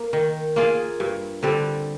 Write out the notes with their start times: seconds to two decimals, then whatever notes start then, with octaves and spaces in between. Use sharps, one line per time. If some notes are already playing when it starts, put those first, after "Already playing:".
Already playing: A#3
0.13 D#3
0.56 A#3 F4 G#4
1.00 G2
1.43 D3 G3 C4